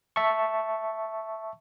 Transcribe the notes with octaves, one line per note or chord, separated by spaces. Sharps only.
E5 A5 C#6